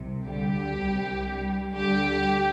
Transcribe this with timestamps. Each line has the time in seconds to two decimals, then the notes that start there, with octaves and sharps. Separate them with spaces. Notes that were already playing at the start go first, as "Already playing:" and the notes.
Already playing: C2 C3
0.26 D2 D3 G3 G4
0.75 C2 C3 G3
1.24 G2 G3
1.74 D2 D3 G3 G4